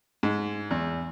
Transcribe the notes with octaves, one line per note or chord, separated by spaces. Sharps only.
G#2
E2